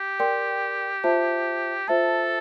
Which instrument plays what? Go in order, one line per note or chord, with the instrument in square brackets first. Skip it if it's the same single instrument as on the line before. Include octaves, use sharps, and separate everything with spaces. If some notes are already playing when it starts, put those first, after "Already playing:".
Already playing: [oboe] G4
[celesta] A#4 D5 G5 C6
F4 C5 E5 A5
[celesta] F4 C5 E5 A5 [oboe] A4